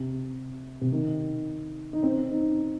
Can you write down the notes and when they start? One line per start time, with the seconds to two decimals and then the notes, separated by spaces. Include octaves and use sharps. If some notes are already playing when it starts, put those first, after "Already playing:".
Already playing: C3
0.81 C3
0.92 D#3
1.93 D#4
2.03 C4
2.31 D#4